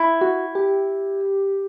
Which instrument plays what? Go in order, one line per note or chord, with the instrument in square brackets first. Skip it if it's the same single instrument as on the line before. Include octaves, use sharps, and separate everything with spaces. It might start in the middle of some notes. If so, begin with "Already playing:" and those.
Already playing: [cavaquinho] E4
[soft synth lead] F#4
G4